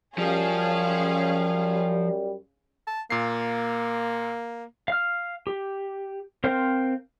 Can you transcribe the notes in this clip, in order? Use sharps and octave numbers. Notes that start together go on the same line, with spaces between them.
F#2 F3 G3 C#4 G#4 F5
A5
A#2 A#3 C7
F5 F6
G4
C4 A#4 C5 F5 G5